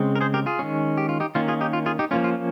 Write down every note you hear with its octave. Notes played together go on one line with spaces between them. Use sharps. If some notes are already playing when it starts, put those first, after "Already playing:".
Already playing: C#3 G#3 C4
A#4
G#4 C5
G4 A#4
F4 G#4
D#3 G#3 C#4
G4
F4
D#4 G4
D#3 A#3 C#4 F4
F4 G#4
D#4 G4
F4
F4 G#4
D#4 G4
F3 A#3 C#4 F4
F4